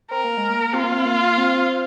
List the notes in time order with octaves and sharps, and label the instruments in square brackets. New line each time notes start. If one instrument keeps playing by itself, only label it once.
[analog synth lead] C4 [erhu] A#4
[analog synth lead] A#3
G#3
A#3
[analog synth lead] C4 [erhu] F4
[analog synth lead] A#3
C4
A#3
C4